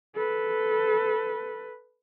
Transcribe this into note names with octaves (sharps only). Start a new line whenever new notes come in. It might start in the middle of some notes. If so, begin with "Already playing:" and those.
A4 B4